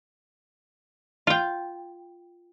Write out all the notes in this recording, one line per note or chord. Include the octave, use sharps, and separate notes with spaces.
F4 G5